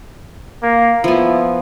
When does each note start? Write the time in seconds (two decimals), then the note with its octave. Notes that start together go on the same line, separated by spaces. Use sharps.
0.63 A#3
1.04 F3 B3 E4